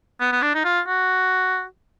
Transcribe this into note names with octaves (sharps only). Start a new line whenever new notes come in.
B3
B3
D4
D#4
F4
F#4